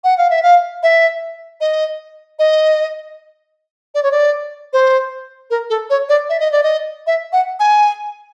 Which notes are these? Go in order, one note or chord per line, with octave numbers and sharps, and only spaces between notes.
F#5
F5
E5
F5
E5
D#5
D#5
D5
C#5
D5
C5
A#4
A4
C#5
D5
E5
D#5
D5
D#5
E5
F#5
G#5